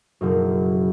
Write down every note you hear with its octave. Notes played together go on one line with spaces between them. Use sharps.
F#1 B1 F#2